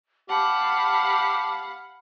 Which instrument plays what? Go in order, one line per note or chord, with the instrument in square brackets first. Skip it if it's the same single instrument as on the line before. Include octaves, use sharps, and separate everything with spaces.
[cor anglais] G4 [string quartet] F5 F#5 B5 [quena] A5